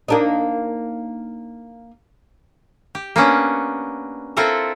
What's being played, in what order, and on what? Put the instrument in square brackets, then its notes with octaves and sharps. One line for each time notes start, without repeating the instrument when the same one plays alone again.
[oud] A#3 D4 D#4
[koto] G4
A#3 B3 C#4 D4
C4 E4 F4 A4 A#4 E5